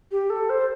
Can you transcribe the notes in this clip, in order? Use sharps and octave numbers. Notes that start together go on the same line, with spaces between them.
G4
A4
C5